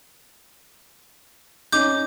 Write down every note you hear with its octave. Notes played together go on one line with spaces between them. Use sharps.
C#4 D#4 D6 G6